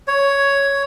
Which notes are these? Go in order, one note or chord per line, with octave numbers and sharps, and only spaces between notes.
C#5